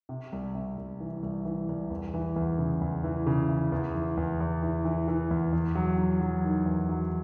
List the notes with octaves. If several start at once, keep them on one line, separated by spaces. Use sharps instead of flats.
C3
C2
C3
C2
E3
C2
E3
C2
E2
E3
E2
C#3
E2
E3
C#3
E3
E2
E3
E2
E2
E3
E3
E3
E2
E2
F#3
F#3
F#3
D#3
E2
F#3